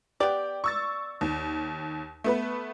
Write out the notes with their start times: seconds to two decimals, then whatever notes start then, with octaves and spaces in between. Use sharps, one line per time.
0.20 B3 G4 D5
0.64 C#6 E6 A6
1.21 D#2
2.24 A3 B3 B4